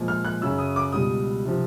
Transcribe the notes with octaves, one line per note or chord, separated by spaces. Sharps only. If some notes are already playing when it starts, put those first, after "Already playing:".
Already playing: A#2 F3 G#3
F6
F#6
F#2 C#3 F#3 E6
D#6
D6
C#2 B2 G3 D#6
C3 F3